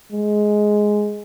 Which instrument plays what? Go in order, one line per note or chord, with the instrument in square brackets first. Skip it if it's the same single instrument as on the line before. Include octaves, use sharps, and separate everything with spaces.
[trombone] G#3